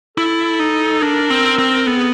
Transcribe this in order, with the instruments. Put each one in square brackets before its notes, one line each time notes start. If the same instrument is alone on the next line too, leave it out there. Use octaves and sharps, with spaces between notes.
[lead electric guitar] E4 [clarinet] A4
[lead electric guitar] D#4
[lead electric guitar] D4 [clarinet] A#4
[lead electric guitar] C4
C4
[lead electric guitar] B3 [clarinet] A4
[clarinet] G#4